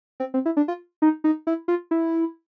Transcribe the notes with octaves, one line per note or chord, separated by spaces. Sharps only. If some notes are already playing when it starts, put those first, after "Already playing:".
C4
C4
E4
D4
F4
D#4
D#4
E4
F4
E4